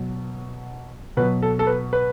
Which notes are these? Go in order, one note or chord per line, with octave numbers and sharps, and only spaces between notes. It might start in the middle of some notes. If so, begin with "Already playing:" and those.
Already playing: B2 F#3
B2 F#3 B4
A4
A4
B4
B4